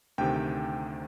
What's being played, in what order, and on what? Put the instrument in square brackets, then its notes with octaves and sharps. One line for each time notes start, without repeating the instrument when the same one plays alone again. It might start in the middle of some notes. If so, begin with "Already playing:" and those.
[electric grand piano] D2 C3 D#3 G5